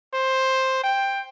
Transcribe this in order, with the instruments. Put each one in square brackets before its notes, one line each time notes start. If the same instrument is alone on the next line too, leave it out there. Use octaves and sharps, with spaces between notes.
[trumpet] C5
G5